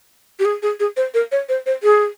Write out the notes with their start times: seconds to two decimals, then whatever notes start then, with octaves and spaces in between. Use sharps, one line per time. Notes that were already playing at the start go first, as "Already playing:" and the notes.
0.39 G4
0.45 G#4
0.63 G#4
0.80 G#4
0.97 C5
1.14 A#4
1.32 C#5
1.49 C5
1.66 C5
1.83 G#4